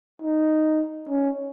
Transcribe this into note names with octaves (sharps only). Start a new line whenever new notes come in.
D#4
C#4